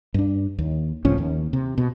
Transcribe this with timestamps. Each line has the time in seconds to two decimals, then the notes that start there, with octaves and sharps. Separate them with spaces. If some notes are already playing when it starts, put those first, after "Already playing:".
0.14 G2 D4
0.58 D#2
1.05 C#2 A2 F3 C#4
1.18 D#2
1.53 C3
1.78 B2